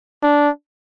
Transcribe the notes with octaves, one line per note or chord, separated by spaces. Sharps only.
D4